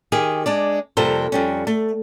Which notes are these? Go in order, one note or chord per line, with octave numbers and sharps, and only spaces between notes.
D#3 G4 G#4
G#3 D4 D5
F2 C3 G3 A#3 A4 C5
F2 G3 C#4
A3